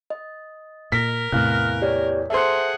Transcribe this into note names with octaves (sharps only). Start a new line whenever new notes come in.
D#5
A#2 A#4 B6
E2 A2 C3 F5 F6 F#6
G4 C#5 D5
G#4 A4 C5 E5 F#5